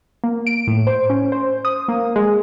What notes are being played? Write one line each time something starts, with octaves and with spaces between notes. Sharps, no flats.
A#3
D7
A2
C5
C#4
C5
D#6
A#3
G#3